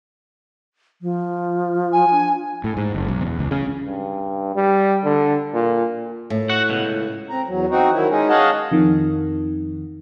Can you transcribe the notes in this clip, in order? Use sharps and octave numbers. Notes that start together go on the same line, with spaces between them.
F3
G#5
D4
A2
G#2
F#1
B1
E2
C#2
C#3
G2
G3
D3
A#2
A2
F#4 F#5
C#2 B2
C#2
C4 A#5
E2 F#3
C4 D#4 F#4
D#3 F#3 E4
G#3 C#4 D#4
G#4 C#5 D#5 F5 F#5 A5
F2 D#3